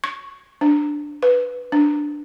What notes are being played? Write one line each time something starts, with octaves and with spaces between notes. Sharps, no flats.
C#6
D4
B4
D4